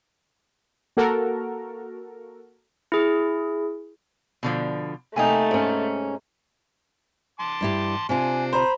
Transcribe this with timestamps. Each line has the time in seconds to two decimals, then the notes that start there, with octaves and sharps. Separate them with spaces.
0.97 A#3 F#4 A4 A#4
2.92 E4 G#4
4.43 B2 D3 F3
5.16 C3 A3 A#3 D#4 G5 G#5 A#5
5.51 G#2 C#4
7.40 A5 C6 D6
7.61 G2 E4 G4
8.09 C3 C4 D4 F4 G#5
8.53 C5 A#5 B5